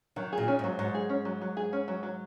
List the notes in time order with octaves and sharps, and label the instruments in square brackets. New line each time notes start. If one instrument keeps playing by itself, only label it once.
[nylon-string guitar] D#3 [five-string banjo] F#3
[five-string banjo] G#4
[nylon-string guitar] A#2
[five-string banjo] C#4
[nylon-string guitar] G#2 [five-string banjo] F#3
[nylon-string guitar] G#2 [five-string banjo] F#3
[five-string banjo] G#4
C#4
F#3
F#3
G#4
C#4
F#3
F#3